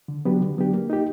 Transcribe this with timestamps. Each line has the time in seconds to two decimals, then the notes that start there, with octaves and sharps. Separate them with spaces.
0.08 D3
0.25 F#3 B3 D4 G4
0.41 D3
0.58 F#3 B3 D4 G4
0.74 A#3
0.90 D#4 G4